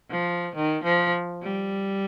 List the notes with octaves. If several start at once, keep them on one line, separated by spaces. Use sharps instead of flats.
F3
D#3
F3
G3